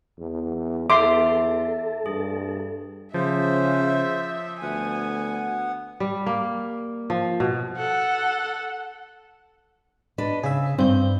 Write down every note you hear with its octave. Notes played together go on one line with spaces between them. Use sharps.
E2
E2 A4 E5 C6 D6
G2 G#4
C#3 F3 C5 E5
D2 B3 F#5 G#5
G3
A#3
F3
B2
A4 F#5
D4 B4 D#5
C#3 G#4 E5
G2 C4 G6